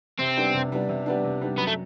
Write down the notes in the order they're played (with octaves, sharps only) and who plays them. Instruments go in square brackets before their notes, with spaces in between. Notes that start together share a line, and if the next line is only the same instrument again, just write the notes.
[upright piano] C3 [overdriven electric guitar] C4
[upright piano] G3 B3 D4
C3
G3 B3 D4
C3
G3 B3 D4
C3
G3 B3 D4
[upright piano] F#2 [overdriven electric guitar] B3
[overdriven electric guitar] A3